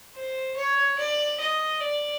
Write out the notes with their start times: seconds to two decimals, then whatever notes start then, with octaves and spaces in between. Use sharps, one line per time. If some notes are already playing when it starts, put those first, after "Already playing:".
0.15 C5
0.56 C#5
0.98 D5
1.40 D#5
1.81 D5